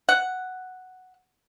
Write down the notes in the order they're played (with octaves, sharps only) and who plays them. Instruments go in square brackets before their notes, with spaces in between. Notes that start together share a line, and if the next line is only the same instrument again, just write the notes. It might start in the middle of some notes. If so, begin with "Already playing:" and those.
[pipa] F#5